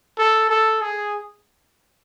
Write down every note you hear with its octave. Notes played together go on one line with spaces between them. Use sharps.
A4
A4
G#4